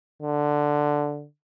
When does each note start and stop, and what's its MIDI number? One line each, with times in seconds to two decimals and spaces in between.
0.22 1.25 50